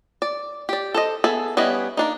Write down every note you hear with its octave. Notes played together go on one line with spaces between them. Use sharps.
D5
G4 D5
A4 C5 D#5
B3 G#4 A4 E5
G3 B3 C#4 E4 D#5
A#3 D4 D#4